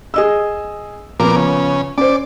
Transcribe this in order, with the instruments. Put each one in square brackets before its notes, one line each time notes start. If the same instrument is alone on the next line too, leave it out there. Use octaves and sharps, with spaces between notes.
[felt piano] G#4 D#5 E6
[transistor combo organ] A#2 A#3 D6 [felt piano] F3 B3
[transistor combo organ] C#3
[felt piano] C#4 C5 [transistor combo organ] D5